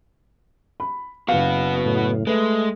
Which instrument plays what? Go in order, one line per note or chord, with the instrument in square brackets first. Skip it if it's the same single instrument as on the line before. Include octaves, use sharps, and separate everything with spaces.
[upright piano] B5
[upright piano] F#1 F5 [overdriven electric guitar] B3 F#4
[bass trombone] A2
[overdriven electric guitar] G#3 [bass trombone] A3 [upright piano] B4